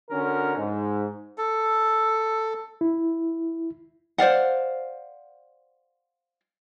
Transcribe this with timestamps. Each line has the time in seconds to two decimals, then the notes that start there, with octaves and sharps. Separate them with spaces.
0.10 D3 C#4 F#4 A#4
0.57 G#2
1.38 A4
2.81 E4
4.18 C5 D5 F5 F#5